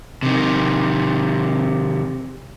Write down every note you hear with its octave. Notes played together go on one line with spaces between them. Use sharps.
C3 D#3